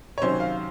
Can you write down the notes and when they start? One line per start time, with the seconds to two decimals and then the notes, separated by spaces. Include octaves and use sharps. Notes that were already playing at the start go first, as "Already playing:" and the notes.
0.18 C#5
0.22 C3 D#3 F#3 C#4 C5
0.40 F5